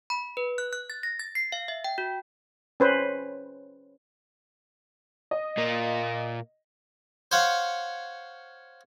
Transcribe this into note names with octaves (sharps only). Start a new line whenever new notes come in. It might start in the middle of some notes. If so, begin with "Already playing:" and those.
B5
B4
F#6
F#6
A6
A#6
A6
C7
F5
E5
G5
F#4
C#4 B4 C5
D#5
A#2 A#3
C5 C#5 F5 F#5